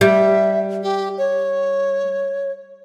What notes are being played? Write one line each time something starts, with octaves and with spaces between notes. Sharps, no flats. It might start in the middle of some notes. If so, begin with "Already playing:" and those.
G3 E5
G4
C#5